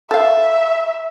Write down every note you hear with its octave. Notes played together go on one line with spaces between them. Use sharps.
A4 E5 F5